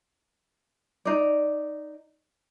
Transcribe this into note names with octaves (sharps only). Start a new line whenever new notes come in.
D#4 D5